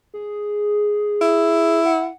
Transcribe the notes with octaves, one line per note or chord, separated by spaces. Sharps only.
G#4
E4
F#5